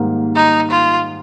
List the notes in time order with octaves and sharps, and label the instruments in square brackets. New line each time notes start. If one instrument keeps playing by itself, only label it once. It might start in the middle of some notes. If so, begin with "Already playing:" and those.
Already playing: [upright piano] G#2 D#3 G3 A#3
[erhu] D#4
F4